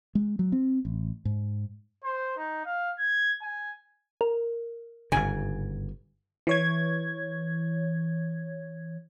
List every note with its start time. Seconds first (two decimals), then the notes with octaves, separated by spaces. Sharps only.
0.15 G#3
0.39 F#3
0.52 C4
0.85 A1
1.25 G#2
2.04 C5
2.37 D#4
2.65 F5
2.99 G#6
3.42 G#5
4.21 A#4
5.12 G1 G#2 C#3 G#5
6.47 E3 C#5 G#6